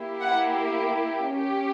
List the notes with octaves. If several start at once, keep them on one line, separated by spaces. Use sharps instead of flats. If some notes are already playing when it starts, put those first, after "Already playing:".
Already playing: A#3 E4 G4
F#5
C#4 G4